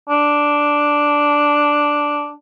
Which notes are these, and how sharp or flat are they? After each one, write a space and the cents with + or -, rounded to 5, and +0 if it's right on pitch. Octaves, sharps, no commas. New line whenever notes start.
D4 +0